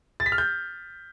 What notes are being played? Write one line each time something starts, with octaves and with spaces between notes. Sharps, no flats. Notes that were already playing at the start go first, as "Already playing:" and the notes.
A6
B6
F6
G6